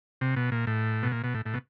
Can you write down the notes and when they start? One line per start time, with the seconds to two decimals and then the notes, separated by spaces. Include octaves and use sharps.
0.21 C3
0.36 B2
0.52 A#2
0.67 A2
1.03 B2
1.12 A#2
1.24 B2
1.34 A2
1.46 A2
1.53 B2